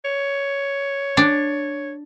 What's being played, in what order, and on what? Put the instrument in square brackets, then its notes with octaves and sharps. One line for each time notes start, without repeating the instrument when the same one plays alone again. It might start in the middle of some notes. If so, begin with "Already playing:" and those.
[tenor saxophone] C#5
[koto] D4